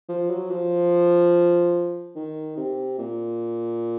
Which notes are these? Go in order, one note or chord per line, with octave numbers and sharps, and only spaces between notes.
F3
F#3
F3
D#3
C3
A#2